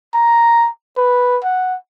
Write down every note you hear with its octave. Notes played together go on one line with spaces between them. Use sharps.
A#5
B4
F#5